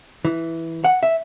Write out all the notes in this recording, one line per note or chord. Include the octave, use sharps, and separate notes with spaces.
E3
F#5
E5